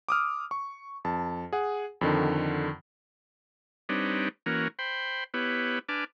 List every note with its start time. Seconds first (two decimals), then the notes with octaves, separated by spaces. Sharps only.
0.09 D6 D#6 F6
0.51 C#6
1.05 F2 A5
1.53 G#4 F#5
2.01 F2 D3 D#3
3.89 G3 C4 D4 D#4 B4 C#5
4.46 E3 A#3 C#4 F#4 A#4
4.79 C5 G5 B5 C6
5.34 B3 E4 G4 B4 C#5
5.89 D4 B4 G#5 A5 D6 F6